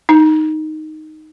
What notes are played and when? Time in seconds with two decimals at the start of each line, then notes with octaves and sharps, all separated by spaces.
0.09 D#4